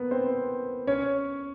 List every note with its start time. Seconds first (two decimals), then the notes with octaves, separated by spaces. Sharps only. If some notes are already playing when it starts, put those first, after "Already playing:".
Already playing: A#3 B3 A#4 B4
0.11 C4 C5
0.87 C#4 C#5